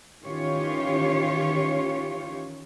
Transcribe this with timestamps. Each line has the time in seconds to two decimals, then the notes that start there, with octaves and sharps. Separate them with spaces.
0.24 D#3 E3 C#4 F4 G4 C#5